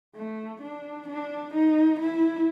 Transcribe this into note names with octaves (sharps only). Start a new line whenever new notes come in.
A3
D4
D4
D#4
E4